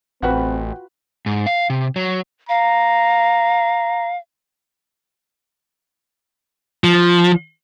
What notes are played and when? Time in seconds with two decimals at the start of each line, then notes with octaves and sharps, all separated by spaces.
0.22 A1 C4 F4 F#4 B4 F#5 G5 B5
1.26 G#2
1.46 F5
1.70 C3
1.96 F#3
2.49 F5 A#5
6.84 F3